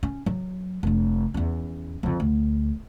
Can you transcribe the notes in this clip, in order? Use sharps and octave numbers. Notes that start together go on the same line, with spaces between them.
C#4
F#3
F1 D4
E2 C#4
F2 D3
D2